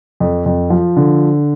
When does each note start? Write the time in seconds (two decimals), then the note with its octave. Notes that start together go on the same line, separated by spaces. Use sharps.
0.20 F2
0.46 F2
0.70 F3
0.96 D3